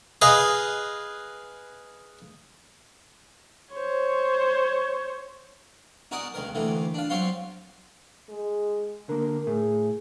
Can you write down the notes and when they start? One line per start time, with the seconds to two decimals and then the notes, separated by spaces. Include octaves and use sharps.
0.22 G#4 B4 D#5 F5
3.73 C5 C#5
6.11 D#4 F#4 A#4 D5 G#5 D#6
6.34 C#2 D#3 A#4
6.55 D2 D#3 E3 A#3
6.94 D4 F4
7.10 F#3 C4 F4 C#5 F5 C6
8.29 G#3
9.09 D3 A#3 A#4
9.47 A2 G#4